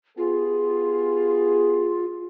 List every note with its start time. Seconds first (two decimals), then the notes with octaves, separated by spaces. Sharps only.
0.18 B3 F4 G4 G#4